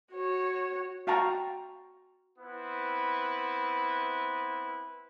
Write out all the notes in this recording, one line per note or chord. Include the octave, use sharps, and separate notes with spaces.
F#4 C#5
F#4 F5 G5 A5 A#5 C#6
B3 C4 E4 B4